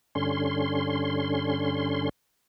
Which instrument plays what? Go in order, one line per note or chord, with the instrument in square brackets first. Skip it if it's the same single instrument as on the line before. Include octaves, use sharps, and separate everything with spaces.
[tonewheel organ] G2 D3 C#4 C6